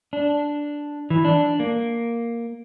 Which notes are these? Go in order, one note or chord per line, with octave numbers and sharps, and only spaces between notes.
D4
E3
D4
A#3